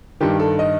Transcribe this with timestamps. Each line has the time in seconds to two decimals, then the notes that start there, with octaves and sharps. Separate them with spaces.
0.20 G2 D#3 G4
0.39 A4
0.59 D#5